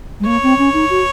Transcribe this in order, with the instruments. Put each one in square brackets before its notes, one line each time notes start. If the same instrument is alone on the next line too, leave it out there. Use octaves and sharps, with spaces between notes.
[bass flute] G#3
[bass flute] A#3 [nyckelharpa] C#5
[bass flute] C4
C#4
D#4
F#4